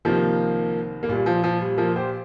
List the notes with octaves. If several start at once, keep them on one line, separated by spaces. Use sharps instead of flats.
C2 C3 D#3 F3 A#3
A#3
A#1 A#2 G3
F3
F3
G3
F3 A#3
G4 C5